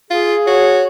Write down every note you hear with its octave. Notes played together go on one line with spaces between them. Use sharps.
F4 G#4
F#4 C#5